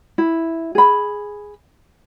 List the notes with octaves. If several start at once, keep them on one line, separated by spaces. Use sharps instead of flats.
E4
G#4 B5